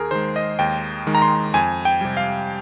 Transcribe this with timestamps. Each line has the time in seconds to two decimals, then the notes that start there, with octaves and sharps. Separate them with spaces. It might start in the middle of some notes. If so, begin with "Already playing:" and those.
Already playing: D#2 G#4 A#4
0.11 D#3 G#3 C5
0.36 D#5
0.59 D#2 G5
1.07 D#3 G#3
1.15 A#5
1.22 C6
1.54 F2 G#5
1.85 G5
2.01 C3 G3
2.17 F5